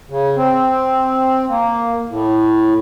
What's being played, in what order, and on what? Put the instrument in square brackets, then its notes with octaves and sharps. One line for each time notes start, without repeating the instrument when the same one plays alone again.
[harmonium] C#3
C4
A#3
A2